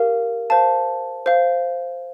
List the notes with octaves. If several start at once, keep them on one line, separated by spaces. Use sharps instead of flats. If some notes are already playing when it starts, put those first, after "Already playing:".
Already playing: G4 A#4 F5
C5 F5 A5
C5 F5